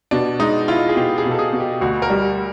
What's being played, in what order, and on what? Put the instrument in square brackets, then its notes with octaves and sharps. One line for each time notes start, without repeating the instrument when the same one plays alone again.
[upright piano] B2 [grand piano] D4
[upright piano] G#3 [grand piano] D#4
[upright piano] E4 [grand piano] F4
[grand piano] G#4
[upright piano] B2 [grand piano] G4
[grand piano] G#4
[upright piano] B2
[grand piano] A4
G#4
[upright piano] B2
[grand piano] G4
[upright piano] D2 [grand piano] F#4
[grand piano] A#4
[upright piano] G3